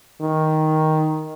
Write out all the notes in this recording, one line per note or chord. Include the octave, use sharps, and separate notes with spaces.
D#3